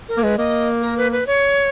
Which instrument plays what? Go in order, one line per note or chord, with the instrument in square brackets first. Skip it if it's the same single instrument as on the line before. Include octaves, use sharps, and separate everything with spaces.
[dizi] A#4
[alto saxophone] A#3
[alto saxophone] G#3 [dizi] B4
[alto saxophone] A#3 [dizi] D#5
[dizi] A#4
B4
B4
C#5